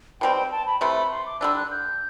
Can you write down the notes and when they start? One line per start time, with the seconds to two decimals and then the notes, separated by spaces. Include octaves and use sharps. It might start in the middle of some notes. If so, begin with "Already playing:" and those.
0.21 B2 G3 C4 G5
0.36 G5
0.52 A5
0.67 B5
0.81 C3 E3 A3 B5
0.96 B5
1.11 C6
1.26 D6
1.41 D3 G3 D4 E6
1.56 F#6
1.71 G6